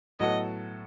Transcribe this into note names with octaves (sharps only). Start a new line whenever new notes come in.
A2 F#3 B3 F#4 A4 D#5